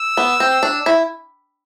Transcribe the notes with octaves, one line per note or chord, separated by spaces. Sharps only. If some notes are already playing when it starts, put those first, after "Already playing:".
Already playing: E6
B3
C4
D4
E4